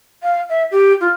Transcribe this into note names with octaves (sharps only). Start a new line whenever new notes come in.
F5
E5
G4
F4